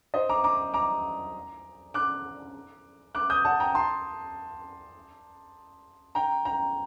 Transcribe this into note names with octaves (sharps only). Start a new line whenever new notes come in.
C5 D#5
A#5 D6
A#5 D6
A#5 D6
D6 F#6
D6 F#6
D#6 G6
F#5 A5
G5 A#5
A5 C6
G5 A#5
G5 A#5